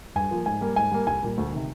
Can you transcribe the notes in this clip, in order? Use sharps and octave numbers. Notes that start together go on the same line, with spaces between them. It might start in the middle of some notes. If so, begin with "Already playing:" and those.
G2 G#5
F3 A#3
G#2 G#5
G3 A#3
G#2 G#5
G3 A#3
C2 G#5
A#2 G3 A#3
D2
C3 D#3